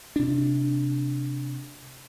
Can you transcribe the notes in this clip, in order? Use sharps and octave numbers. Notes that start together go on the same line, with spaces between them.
C3 D4